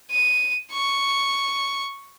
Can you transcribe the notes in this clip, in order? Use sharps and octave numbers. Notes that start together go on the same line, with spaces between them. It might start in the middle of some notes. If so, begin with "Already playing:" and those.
D#7
C#6